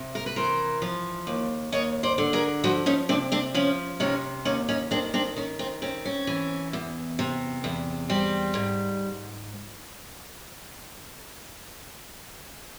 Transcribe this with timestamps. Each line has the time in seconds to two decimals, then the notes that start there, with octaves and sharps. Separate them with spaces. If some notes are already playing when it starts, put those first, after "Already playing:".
Already playing: C3
0.15 A#4
0.26 B4
0.36 E3 A#4 C5
0.82 F3
1.27 D#2
1.72 D#2 C#5 D#5
2.03 C5 D5
2.18 D3
2.33 G#4 A#4
2.64 F3 E4 F#4
2.86 C#4 D#4
3.09 C3 C4 D4
3.32 C4 D4
3.54 F3 C#4
4.00 C3 C#4 D#4
4.45 D#2 C#4 D#4
4.68 C#4 D#4
4.91 D#3 C4 D4
5.14 C4 D4
5.36 D#3 C#4
5.59 C4
5.82 C4 C#4
6.05 C#4
6.27 E3
6.73 E2
7.19 C3
7.64 E2
8.10 G3 C4
8.55 G#2